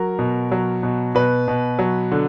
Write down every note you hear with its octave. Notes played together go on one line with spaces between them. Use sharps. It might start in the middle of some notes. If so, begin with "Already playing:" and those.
Already playing: F#3 A#4
B2
F#3
B2
B2 B4
B2
F#3
D3